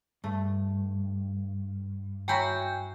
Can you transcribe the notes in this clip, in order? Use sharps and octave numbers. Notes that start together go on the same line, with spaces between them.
G2 A3
F#3 E4 F#4 G5 G#5 G6